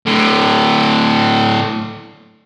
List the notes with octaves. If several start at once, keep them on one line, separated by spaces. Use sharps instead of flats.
A2 D3